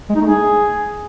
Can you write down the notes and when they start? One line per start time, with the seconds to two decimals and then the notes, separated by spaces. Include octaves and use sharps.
0.09 G#3
0.15 D#4
0.21 A3
0.27 G#4